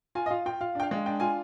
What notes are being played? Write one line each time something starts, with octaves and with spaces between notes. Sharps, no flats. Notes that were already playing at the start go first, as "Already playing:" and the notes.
F4 G#5
D#5
F4 F5
F4 G5
F4 F5
D4 G5
F5
G#3
D4 G5
F4 G#5